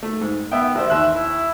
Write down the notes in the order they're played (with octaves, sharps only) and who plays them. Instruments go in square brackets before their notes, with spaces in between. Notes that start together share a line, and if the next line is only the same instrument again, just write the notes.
[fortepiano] A3
G#2
[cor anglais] B3 [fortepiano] E5 G5
[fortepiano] A1 C5 [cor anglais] E5
[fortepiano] D#2 C6 F#6 [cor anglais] E5
[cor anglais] E4